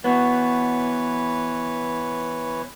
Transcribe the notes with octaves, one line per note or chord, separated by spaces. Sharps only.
E3 B3 F#4 B4 C#5